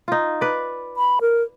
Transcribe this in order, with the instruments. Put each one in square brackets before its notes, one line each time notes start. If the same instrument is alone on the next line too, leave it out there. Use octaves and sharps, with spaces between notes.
[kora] D#4 F4
B4 D5
[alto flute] B5
A#4